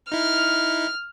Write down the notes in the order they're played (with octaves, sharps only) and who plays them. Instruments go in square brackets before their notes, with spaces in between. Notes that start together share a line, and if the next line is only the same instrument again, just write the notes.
[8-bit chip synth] D#4 E4 [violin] F6